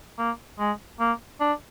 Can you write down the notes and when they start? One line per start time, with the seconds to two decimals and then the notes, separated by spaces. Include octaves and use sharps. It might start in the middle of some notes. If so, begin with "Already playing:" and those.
0.18 A#3
0.59 G#3
0.99 A#3
1.40 D4